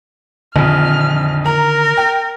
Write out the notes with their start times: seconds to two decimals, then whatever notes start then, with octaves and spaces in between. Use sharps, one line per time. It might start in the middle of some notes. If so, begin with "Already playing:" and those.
0.56 A#1 F2 D3 D#3 F6
1.46 A#4 A#5
1.97 G5